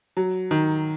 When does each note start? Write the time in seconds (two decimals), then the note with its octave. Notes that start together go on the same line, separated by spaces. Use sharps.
0.17 F#3
0.51 D#3